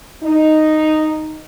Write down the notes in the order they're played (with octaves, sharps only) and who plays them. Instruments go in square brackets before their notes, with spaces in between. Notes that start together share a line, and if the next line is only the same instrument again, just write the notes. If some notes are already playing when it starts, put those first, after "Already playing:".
[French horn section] D#4